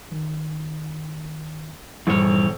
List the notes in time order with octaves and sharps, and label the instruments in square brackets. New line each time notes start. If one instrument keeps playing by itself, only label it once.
[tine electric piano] D#3
[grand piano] D#1 [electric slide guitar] E2 C#5 [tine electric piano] G2 G3 F6